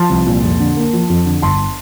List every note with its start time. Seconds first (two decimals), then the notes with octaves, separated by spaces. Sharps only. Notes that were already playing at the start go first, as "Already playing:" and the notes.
Already playing: F3 A5 C6
0.10 C2
0.26 A#2
0.43 F2
0.60 D3
0.76 A#3
0.93 F3
1.10 F2
1.26 D3
1.42 G1 A5 C6